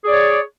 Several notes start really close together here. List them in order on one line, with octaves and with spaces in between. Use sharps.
G#4 D5 C#5